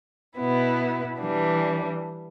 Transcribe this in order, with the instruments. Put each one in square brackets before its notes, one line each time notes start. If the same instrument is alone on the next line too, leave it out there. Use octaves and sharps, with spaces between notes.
[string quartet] B2 B3 E4
E3 G3 D4